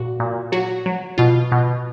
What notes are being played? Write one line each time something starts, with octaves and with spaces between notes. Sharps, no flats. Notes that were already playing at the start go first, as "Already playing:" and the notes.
Already playing: A#2 F#4
A#2
F#3 F#4
F#3
B2 F4
B2